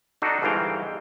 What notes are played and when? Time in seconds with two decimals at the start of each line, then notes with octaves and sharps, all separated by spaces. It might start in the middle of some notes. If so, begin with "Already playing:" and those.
0.22 D4 D#4 F#4 A4
0.42 G1 G#2 E3 F5 G5